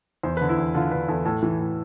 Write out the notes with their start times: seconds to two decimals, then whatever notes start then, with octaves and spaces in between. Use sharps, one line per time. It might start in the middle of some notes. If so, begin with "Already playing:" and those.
0.23 E2 C5
0.37 D3 B4
0.49 E4
0.58 E2
0.74 D3 F4
0.91 D3 B4
1.08 E2 A4
1.25 A2 A4
1.43 E3
1.59 A2